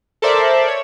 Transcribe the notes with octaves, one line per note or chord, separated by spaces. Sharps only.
A4 A#4 C5 D5 E5
C#5